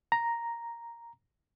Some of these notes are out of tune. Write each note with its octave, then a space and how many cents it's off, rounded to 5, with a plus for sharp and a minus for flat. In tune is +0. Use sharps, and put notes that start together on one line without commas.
A#5 +0